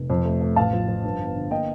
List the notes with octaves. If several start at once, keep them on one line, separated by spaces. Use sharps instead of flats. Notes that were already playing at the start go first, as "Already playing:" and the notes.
Already playing: F1
F2
A3
A3
A1 F5 A5
F3
F3
G2
G1
D3
A#3 D#5 G5